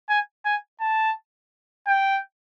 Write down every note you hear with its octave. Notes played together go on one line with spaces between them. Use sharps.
G#5
G#5
A5
G5